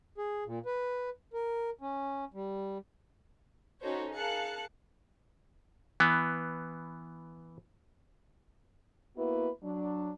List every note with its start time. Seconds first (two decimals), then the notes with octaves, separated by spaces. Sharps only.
0.18 G#4
0.46 A#2
0.66 B4
1.33 A#4
1.81 C#4
2.34 G3
3.82 C#4 D#4 F#4 A4 C5 C#5
4.13 G#4 A#4 F5 A5 F#6 C#7
6.00 E3 B3
9.16 A#3 B3 E4 F#4 B4
9.63 F#3 D4